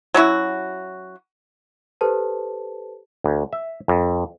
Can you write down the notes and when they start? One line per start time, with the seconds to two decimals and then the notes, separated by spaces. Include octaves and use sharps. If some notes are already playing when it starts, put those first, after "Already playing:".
0.14 F#3 C#4 E4 F#4
2.01 G4 A4 B4 C5 A5
3.24 D2
3.53 E5
3.88 F2